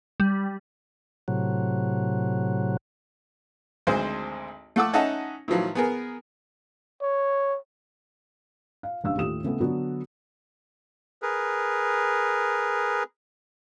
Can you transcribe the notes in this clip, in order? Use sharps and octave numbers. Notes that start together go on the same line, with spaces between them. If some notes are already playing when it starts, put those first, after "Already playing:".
G3
A2 C3 F#3
G#1 D2 G#3 C5
A3 A4 F#5 D6 E6
C#4 D#4 D#5 E5 F#5 A5
A2 D#3 F3 F#3
B3 G#4 A#4
C#5
F5
F#1 G2 F5 E6
D#2 A2 F4 G4 D#6 E7
C#3 A3 B3
D3 F#3 B3 D4 F#4
G#4 A#4 B4